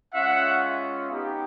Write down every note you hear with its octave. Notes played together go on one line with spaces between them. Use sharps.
G#3 C#4 F4 E5 F#5
B3 D#4 G4